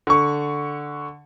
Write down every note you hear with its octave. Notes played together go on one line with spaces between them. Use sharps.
D3 C#6